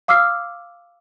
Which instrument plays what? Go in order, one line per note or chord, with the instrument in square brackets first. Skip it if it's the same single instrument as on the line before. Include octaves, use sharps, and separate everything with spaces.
[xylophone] F5 D6 E6 F6 C7